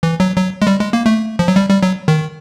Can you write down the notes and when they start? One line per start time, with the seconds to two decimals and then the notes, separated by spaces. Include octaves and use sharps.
0.03 E3
0.20 F#3
0.37 F#3
0.62 G#3
0.67 G3
0.80 G#3
0.93 A#3
1.06 A3
1.39 F3
1.48 F#3
1.56 G3
1.70 G3
1.83 F#3
2.08 D#3